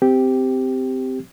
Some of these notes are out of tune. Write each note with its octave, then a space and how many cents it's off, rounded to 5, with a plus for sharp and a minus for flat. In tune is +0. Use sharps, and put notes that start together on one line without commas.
C4 -15 G4 +0